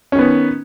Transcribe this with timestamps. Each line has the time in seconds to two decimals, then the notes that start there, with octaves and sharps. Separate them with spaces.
0.12 C#4
0.15 D#3
0.19 B3